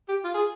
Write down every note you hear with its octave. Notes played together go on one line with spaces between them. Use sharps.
G4
F4
G#4